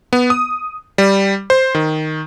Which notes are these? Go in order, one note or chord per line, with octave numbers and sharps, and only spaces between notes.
B3
D#6
G3
C5
D#3